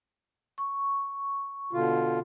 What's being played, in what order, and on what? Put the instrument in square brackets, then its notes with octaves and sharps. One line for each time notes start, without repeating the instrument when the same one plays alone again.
[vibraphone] C#6
[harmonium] B2 D3 F4